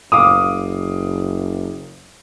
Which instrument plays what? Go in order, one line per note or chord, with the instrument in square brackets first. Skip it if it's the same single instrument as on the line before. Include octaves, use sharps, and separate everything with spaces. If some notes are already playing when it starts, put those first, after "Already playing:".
[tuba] F#1 [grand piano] F5 D6 D#6